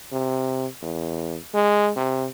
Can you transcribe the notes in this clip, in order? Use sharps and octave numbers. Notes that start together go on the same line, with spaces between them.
C3
E2
G#3
C3